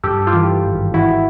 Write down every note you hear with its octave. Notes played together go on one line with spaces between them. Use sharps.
G2 G4 A4
G2
F4 G4
E3
E3
G#1
G#1
E3 E4 F#4